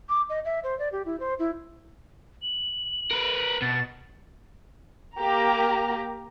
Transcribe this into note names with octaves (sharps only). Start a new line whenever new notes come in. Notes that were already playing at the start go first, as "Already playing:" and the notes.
D6
D#5
E5
C5
D5
G4
E4
C5
E4
F#7
A#4 B4
B2 A6
A#3 G4 A#5